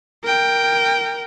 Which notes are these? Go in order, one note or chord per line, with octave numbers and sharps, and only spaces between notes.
A#4 G5